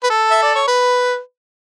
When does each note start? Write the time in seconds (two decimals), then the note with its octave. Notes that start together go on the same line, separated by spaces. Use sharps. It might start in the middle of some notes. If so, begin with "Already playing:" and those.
0.03 B4
0.10 A4
0.31 E5
0.42 D5
0.55 C#5
0.67 B4